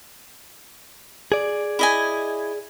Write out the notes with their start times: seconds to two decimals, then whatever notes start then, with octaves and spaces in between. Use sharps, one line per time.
1.32 G#4 D5
1.79 E4 D#5 G#5